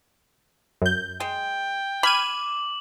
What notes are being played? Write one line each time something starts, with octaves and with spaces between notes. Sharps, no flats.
F#2 G6
G#3 G5
B5 D6 F6 G#6 D#7 F#7